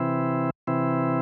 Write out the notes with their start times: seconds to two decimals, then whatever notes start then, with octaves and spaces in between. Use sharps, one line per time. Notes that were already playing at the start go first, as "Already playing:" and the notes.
Already playing: C3 E3 C4 E4
0.67 C3 E3 C4 E4